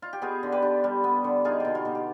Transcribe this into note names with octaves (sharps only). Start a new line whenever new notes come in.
F4
G4
B3 F4 G#4
D3
G4 B4
D4
G3
B3
D3
D#4 F4 G#4
B2 G4
F4
B2
G4